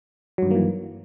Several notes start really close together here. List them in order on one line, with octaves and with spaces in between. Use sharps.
F#3 G2 D#3 A#3 E3